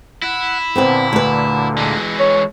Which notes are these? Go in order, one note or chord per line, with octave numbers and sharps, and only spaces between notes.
E4 F#5
A#2 D3 B3 C4 B4
D2 B4
E3 G#3
C#5